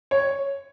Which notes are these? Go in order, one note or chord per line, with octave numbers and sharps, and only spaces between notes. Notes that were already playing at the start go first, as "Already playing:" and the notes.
C#5